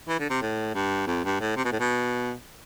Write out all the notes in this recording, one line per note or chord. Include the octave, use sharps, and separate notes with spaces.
E3
D3
C3
A2
G2
F2
G2
A2
C3
B2
A2
B2